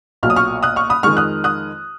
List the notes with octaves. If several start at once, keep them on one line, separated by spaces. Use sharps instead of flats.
B1 A#2 F#3 F6
D#6
C#6 F6
D#6 F#6
C#6 F6
B5 D#6
F2 D#3 G#3 C#6 F6
D#6 F#6
D#6 F#6